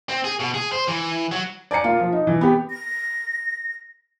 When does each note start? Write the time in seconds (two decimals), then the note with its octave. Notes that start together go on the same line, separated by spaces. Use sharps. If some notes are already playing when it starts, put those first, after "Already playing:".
0.09 C4
0.24 G#4
0.40 B2
0.54 G#4
0.72 C5
0.88 E3
1.32 F#3
1.71 D5 G#5 A#5 C#7
1.84 A#3 F4
2.00 F3
2.13 D#4
2.27 E3
2.41 B3 G4
2.70 A#6